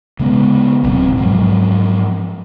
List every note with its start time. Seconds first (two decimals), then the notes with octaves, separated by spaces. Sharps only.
0.20 C#3 G#3 B3
0.84 D1 B1 C4
1.17 G#2 F3 F#3